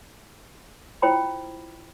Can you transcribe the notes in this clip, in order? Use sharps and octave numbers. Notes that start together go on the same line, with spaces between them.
E4 F4 C5 G5 A#5 B5